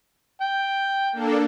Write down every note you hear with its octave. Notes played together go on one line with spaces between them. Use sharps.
G5
A#3 D4 A4